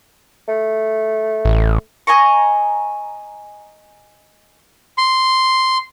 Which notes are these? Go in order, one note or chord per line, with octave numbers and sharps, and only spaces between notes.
A3
A1
D#5 G#5 A#5 C#6
C6